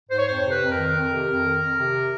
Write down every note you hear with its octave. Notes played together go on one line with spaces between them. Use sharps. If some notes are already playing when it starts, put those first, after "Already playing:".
G#2 C5
C#5
F2 C5
C3
B4
F2
A#4
D#3
F2
C3
F2
D#3
F2
C3